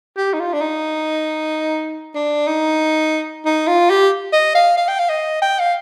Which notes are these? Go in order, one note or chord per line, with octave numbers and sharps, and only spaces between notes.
G4
D#4
F4
D4
D#4
D4
D#4
D#4
F4
G4
D#5
F5
F5
G5
F5
D#5
G5
F5